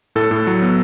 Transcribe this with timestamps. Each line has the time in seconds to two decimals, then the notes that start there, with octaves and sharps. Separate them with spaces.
0.16 A2 A4
0.31 A2
0.47 F#3
0.62 B3